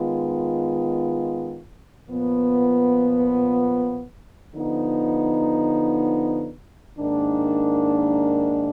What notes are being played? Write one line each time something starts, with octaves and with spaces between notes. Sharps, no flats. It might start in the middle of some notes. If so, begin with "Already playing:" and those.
Already playing: D#3 G#3 B3 F4
A#2 F3 B3
D3 F3 B3 D#4
G#2 D#3 A#3 D4